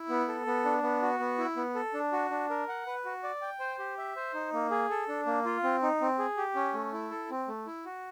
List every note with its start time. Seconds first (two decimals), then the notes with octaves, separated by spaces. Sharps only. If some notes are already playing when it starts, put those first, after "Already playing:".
Already playing: E4
0.09 B3
0.28 A4
0.47 B3
0.65 D4
0.83 B3
1.02 F#4
1.19 B3
1.38 E4
1.57 B3
1.75 A4
1.94 D4
2.13 F#4
2.30 D4
2.50 A#4
2.68 F#5
2.87 B4
3.05 F#4
3.23 D5
3.42 G5
3.60 C5
3.79 G4
3.98 E5
4.16 C5
4.34 D#4
4.53 A#3
4.71 G#4
4.90 A4
5.08 D4
5.26 A#3
5.45 F4
5.64 C4
5.82 D#4
6.01 C4
6.19 G#4
6.37 G4
6.55 C#4
6.74 A3
6.93 E4
7.11 A4
7.30 C4
7.48 A3
7.66 E4
7.86 F#4